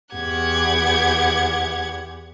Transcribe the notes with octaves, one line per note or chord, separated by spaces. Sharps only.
E2 G4 F#5 G#6